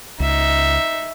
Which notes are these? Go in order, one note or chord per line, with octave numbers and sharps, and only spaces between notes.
C#2 D#4 E5